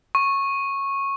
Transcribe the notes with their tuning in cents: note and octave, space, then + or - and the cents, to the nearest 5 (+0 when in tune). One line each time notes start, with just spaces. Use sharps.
C#6 -10